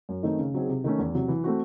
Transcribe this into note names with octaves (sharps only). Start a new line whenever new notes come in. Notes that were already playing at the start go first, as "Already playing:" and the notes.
F#2
D#3 A3 C4 D#4
C#3
F#3 C4 D#4 G#4
C3
D#3 A3 C#4
E2
C3 F#3
E3
A3 C4 F#4